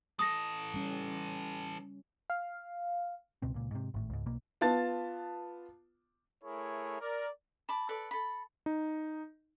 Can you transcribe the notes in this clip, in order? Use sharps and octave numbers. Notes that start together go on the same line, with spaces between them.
E3 A4 D#6 A#6
G3 C#4
F5
C#2 B2 C4
C#2 A#2
G#2 C3
G#1 A2
C#2 G#2
B1 B2 A#3
B3 F4 A5 A6
A3 E4 G#4 A#4 C#5
A#4 D5
A5 B5 D6
A4 B4 D5
A4 B5
D#4